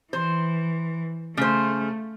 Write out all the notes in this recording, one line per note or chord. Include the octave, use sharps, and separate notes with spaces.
E3 C5
C#3 A3 C5